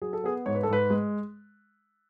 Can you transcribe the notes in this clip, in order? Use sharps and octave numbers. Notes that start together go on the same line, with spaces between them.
F#3 G#4
A4
B3 G#4
G#2 C#5
B4
A4
G#2 B4
G#3